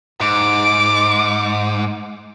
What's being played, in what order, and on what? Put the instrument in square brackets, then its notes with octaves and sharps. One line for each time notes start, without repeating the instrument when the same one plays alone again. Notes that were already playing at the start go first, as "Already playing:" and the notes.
[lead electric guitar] G#2 [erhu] D6